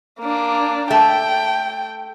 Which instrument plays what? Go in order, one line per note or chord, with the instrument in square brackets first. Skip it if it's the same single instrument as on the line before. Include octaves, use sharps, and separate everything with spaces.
[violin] A#3 D4
[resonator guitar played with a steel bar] A3 [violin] G5